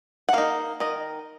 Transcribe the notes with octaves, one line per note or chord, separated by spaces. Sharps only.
F#5
A#3 D#4 F5
D#3 D#5